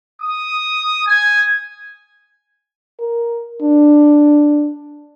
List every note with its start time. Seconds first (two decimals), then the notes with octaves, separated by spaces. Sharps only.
0.22 D#6
1.07 G#5
2.99 A#4
3.62 D4